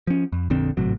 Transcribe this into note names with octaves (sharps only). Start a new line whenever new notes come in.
F3 C#4
F2
A#1 F2 D3 C4
G#1 A2 C3 F#3